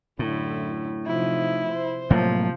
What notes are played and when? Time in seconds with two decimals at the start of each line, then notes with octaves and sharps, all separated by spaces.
0.19 F#2 A2 D3 E4
1.06 C3 F3 D#4 E4
1.69 C5
2.10 A2 C3 F3 F#3 A#3